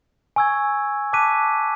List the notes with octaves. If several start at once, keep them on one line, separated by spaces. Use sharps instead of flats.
G#5 C#6 E6 G#6
A5 D6 F#6 B6 D#7